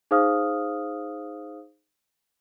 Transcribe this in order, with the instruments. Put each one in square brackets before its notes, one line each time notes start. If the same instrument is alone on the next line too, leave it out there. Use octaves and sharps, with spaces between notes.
[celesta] D#4 G#4 C5 F5 D#6 F6